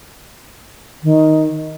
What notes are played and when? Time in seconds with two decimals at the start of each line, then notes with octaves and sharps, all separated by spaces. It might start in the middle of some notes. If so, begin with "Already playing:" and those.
1.03 D#3